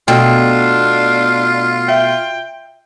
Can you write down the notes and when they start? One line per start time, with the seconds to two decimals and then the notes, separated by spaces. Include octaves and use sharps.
0.08 B2 A3 D4 F4 G5
1.88 E5 G5